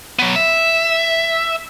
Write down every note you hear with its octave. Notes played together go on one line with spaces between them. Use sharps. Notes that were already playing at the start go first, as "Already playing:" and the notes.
F#3 B3
E5